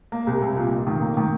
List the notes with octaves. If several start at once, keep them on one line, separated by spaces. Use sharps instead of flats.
A#3
C2
C2
A#2
F1
D#3
A#3
D#3